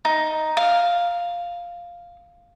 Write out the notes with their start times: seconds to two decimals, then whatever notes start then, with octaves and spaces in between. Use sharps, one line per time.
0.05 D#4
0.57 F5